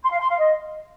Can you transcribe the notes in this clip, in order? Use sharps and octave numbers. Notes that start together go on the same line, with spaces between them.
C6
F5
C6
F5
D#5